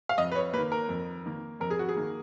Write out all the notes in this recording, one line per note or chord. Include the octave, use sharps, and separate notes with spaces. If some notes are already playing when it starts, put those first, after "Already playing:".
F5
F2 D#5
B4
C#5
D#3 A#3 B4
A#4
F2
D#3 A#3
F2 A#4
G#4
F#4
G#4
D#3 A#3